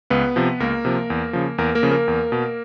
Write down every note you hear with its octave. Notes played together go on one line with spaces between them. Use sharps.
C#2 B3 B4
C3 F3
C#2 A#3 A#4
C3 F3
E2
C#3 F3
E2 A#3 A#4
A#3 A#4
C#3 F3
A#3 A#4
E2
B2